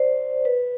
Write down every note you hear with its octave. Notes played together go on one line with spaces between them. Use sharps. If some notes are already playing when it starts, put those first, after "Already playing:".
Already playing: C5 D5
B4